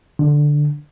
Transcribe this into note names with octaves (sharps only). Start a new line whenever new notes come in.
D3